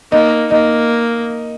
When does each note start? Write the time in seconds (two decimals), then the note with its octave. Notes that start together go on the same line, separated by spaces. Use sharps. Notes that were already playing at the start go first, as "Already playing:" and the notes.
0.12 A#3 D#4
0.51 A#3 D#4